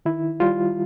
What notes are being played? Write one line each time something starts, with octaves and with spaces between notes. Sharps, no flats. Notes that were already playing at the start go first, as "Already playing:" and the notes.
D#3 E4
G3 F4